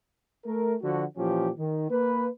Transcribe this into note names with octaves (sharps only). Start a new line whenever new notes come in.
A3 A#4
D3 F3 F#4
A#2 E3 F3 C#4 G4
D#3
A#3 B4